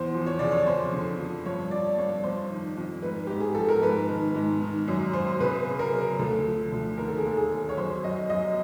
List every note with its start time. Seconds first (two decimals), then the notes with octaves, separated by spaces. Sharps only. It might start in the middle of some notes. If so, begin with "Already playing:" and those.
Already playing: E2 C5
0.14 F3
0.27 C#5
0.39 C#3 D5
0.52 C#5
0.66 F2 C5
0.92 D3
1.19 F3
1.45 G2 C#5
1.71 F3 D5
1.98 G2 C#5
2.23 F2 C5
2.50 D#3
2.77 F2
3.02 G#2 B4
3.27 G#2 G4
3.40 G#4
3.55 F3 A4
3.69 A#4
3.81 G#2 B4
4.09 D#3
4.35 G#2
4.61 D#3
4.88 F#2
5.13 F#2 C5
5.40 C#3 B4
5.67 C#3
5.79 A#4
5.93 C#3
6.19 D2 A4
6.45 F3
6.72 D2
6.98 D#2 A#4
7.08 A4
7.17 G#4
7.25 D#2 A4
7.37 G#4
7.51 D#2
7.69 C#5
7.77 F#2 C5
8.03 F#2 D#5
8.30 F#2 D#5